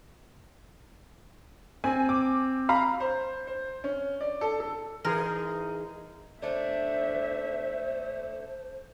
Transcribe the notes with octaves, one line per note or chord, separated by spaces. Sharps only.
C4 G#5
D6
F5 A#5 B5
C5
C5
C#4
D5
A4
A4
E3 D#4 G#4 A#4
A3 D4 C5 E5